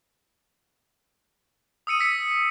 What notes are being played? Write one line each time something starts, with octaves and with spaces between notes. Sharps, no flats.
D#6 E6 C#7 D#7
E6 B6 C#7